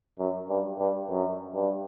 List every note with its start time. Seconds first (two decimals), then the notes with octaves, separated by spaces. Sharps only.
0.19 F#2
0.49 G2
0.79 G2
1.09 F#2
1.54 G2